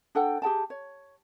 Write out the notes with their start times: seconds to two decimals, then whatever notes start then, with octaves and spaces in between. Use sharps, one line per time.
0.15 D4 A4 F#5 G5
0.42 G4 G#4 G5 A5
0.70 C#5